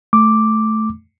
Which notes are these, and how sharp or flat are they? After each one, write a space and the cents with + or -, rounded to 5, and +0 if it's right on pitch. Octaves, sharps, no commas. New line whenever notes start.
A3 -10 D6 +0